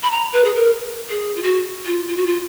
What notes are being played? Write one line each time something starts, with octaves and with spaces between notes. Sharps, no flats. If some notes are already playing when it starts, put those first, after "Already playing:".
B5
A#5
B4
G#4
A#4
G#4
F4
F#4
F4
F4
F#4
F4